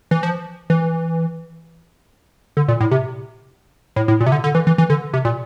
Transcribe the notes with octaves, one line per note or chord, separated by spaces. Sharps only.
E3
F3
E3
D3
A#2
A2
C3
A2
A2
A#2
C3
D3
D3
E3
E3
E3
D3
C3
A#2